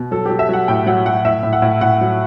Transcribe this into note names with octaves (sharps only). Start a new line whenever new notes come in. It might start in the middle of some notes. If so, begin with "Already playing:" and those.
Already playing: B2
F#3 A4
F#3 G4
E5
F#3 F#5
A2 G5
F#3 F#5
F#3 F#5
A2 E5
A2
F#5
A2
A2 F#5
F#3